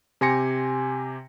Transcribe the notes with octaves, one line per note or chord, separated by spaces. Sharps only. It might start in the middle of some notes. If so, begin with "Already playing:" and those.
C3 G4 G#5 C6 A#6 C#7